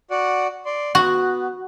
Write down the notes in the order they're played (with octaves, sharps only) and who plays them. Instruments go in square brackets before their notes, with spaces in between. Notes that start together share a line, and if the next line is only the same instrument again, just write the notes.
[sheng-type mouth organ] F#4 D5 F#5
D5 C6
[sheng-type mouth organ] B3 [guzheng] F#4